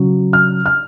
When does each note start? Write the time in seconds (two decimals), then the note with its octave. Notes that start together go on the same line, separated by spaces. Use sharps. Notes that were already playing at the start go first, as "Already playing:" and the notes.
Already playing: C#3 F#3
0.33 F6
0.66 F6